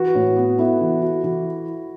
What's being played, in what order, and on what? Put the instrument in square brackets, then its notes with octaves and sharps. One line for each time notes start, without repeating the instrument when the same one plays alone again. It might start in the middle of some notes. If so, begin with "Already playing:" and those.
Already playing: [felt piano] E3 [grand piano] F#4 B4
[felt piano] A2
B3
[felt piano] B3 [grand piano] E4 A4
[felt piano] E3
F#4
E3